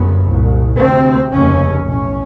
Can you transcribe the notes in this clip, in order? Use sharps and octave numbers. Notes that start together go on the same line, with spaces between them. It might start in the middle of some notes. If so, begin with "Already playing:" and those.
Already playing: G1 F#2 C#3 B3
C2 A#2
D2 C3 C4
F1 D#2 C#3 C#4
B1 A2 C#4